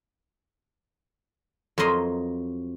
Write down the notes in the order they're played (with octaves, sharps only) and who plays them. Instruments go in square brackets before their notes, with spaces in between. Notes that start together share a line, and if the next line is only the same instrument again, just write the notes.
[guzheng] F2 F#3 A#4 D#5 C6